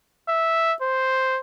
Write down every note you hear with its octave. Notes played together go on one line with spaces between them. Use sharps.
E5
C5